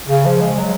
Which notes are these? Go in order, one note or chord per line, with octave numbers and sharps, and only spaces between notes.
C#3
F3
G#3
F#3